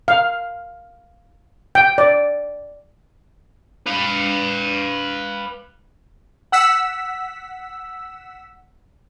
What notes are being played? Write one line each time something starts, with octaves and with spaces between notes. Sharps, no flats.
F5
G5
D5
B4 F5
F#5 E6 B6